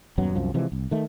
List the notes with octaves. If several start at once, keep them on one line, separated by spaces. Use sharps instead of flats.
D#1 F#2 F#3 B3
C2 F#2 F3
C3 E3 F3 G#3
C2
D#3 A3